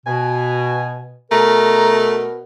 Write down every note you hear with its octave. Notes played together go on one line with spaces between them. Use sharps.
B2 G#5
B2 A3 A#4 A#5